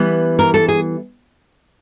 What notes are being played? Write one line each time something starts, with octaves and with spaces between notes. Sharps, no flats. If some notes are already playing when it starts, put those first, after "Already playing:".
Already playing: E3 G3 B3
A#4
A4
G#4